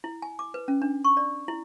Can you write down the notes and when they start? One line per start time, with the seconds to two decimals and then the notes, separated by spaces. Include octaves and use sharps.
0.04 E4
0.22 G#5
0.39 D6
0.54 B4
0.68 C#4
0.82 D4
1.05 C#6
1.17 D5
1.48 E4